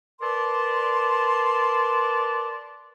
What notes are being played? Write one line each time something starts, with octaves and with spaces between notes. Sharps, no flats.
A#4 B4 D5 A5 C6